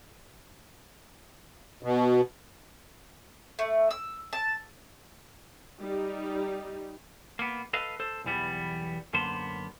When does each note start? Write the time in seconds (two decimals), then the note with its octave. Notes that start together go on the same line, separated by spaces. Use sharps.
1.83 B2
3.59 A3
3.91 E6
4.33 A5
5.81 G3 D#4
7.39 A#3 B3
7.73 A4 B4 D#5 F5
8.00 A4 C5
8.24 B1 E2 E3 G3 B3
9.14 F#2 D3 A#3 B3 C5